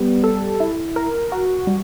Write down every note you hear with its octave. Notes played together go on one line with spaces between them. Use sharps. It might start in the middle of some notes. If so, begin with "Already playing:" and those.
Already playing: G3 B3
A4
E4
A#4
F#4
G3